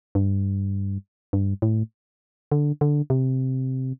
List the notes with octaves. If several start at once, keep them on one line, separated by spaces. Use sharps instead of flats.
G2
G2
A2
D3
D3
C3